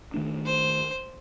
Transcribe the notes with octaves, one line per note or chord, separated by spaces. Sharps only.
D#3 A3 D4
C5